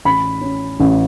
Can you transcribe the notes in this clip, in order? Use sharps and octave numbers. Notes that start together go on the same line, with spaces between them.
A1 B5
C#4
A1